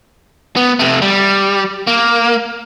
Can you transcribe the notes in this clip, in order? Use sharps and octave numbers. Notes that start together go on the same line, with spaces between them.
B3
C3 A3
G3
A#3